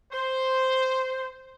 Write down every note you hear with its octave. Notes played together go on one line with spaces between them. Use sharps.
C5